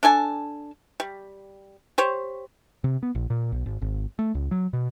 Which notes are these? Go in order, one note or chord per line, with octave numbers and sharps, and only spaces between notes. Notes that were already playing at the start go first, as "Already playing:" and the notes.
D4 A4 G#5 A5
G3
G4 C5 C#5
C3
B3
A#1
A#2
B1
G#1
G#1
A3
C#2
F#3
B2